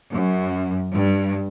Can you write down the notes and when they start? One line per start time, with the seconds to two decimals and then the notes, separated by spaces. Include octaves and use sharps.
0.11 F#2
0.94 G2